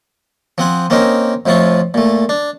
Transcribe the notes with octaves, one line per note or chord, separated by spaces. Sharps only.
F3 C4 F#5 G#5
A#3 C4 C#4 D#4 A#4
F2 A2 F3 E4 F4 C#6
A#2 A3
D4